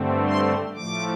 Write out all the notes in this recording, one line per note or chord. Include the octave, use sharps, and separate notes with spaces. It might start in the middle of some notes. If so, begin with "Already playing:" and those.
Already playing: G2 D3 A3 C4
C6
A2 F3 A3 D6